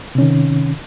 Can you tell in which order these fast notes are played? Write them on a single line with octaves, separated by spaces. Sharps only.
C3 C#4 D#3